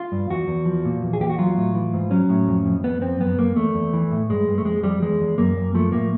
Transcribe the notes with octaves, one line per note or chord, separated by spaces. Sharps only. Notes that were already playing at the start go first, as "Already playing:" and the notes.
Already playing: F4
G2
E2 F#4
E2
F3
A#2
E2
G#4
E2 G4
F#4
F#3 F4
A2
E3
G#2
F#3 C#4
A2
F2
F2
F2 B3
F2 C4
F#2 B3
F#2 A#3
E2 A3
E2
E3
A2
G2 G#3
G2
A3
F2 G#3
F2 G3
E2 G#3
E2
F#2 A#3
F#2
F3 A3
A2 A#3